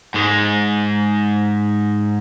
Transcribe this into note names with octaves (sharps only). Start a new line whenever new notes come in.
G#2 G#3